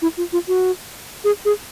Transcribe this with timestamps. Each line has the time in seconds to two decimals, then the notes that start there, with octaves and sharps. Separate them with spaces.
0.02 E4
0.17 F4
0.33 F4
0.48 F#4
1.24 G#4
1.45 G#4